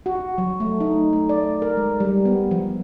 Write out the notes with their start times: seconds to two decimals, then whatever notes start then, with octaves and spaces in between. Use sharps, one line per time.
0.06 F#4
0.38 F#3
0.60 A3
0.80 D#4
1.13 A3
1.29 D5
1.62 A#4
1.77 G#3
2.00 G3
2.25 B3
2.51 F3